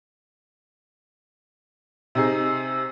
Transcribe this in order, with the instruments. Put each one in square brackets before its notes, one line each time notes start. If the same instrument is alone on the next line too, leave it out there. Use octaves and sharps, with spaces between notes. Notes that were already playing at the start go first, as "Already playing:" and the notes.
[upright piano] C3 D#4 G#4